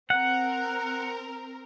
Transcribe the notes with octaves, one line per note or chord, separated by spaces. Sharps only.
C4 A#4 F#5